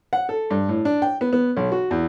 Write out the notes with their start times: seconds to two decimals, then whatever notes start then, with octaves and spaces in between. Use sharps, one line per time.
0.13 F#5
0.29 A4
0.50 G2
0.69 A2
0.85 D4
1.02 G5
1.21 B3
1.33 B3
1.56 B1
1.72 F#4
1.91 E2